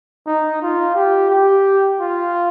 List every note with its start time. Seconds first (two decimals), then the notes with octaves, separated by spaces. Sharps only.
0.27 D#4
0.62 F4
0.96 G4
1.30 G4
2.00 F4